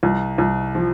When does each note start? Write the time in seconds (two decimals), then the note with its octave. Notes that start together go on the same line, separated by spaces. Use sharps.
0.03 C2
0.38 C2
0.75 F3